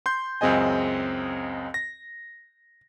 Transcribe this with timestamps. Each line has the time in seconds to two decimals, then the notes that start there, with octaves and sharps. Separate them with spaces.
0.06 C6 G6
0.41 C#2 F#2 C4 G#4 D#5 G#5
1.74 A#6